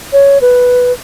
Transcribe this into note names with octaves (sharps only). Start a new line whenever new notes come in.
C#5
B4